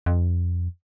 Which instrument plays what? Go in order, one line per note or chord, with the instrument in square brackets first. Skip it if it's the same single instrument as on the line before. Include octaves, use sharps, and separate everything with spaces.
[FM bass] F2